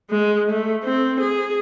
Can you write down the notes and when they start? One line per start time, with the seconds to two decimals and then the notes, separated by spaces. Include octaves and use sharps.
0.10 G#3
0.51 A3
0.84 C4
1.20 G#4